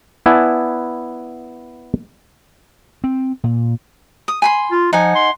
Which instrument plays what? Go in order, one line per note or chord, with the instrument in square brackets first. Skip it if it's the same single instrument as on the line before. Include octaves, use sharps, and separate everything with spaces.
[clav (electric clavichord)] B3 E4 D5 F#5 G#5 A5
[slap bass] C4
A#2
[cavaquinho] D#6
G#5 B5 C6
[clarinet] F4
[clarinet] F3 [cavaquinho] D#4 F#5 G#5
[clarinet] C6